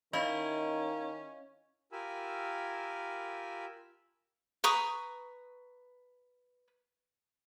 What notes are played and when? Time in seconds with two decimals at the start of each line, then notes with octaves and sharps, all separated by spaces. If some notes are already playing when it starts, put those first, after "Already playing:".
0.13 D#3 C#4 E4 D#5 F5 G#6
1.92 F4 G4 A#4 G#5 B5 E6
4.64 B4 A#5 C#6 D#6